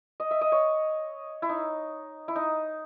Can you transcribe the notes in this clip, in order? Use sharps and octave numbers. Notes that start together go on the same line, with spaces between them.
D#5
E5
D#5
C#5
E4
D#4
E4
D#4